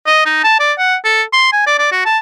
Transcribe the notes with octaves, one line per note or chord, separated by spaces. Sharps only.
D#5
D#4
A5
D5
F#5
A4
C6
G#5
D5
D5
F#4
A5